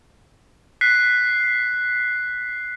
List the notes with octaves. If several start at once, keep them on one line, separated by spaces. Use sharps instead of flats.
F#6 B6 C7